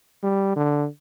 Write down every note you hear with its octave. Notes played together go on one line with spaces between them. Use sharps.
G3
D3